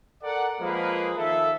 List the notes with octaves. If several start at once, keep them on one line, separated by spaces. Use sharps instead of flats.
A4 A#4 D5 F#5
F3 G#3 A#3 G#4 A#4 B4
D#3 F3 A4 E5